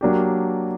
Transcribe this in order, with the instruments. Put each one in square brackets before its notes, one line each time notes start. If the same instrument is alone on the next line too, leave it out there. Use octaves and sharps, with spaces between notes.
[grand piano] F#3 A#3 D4 G4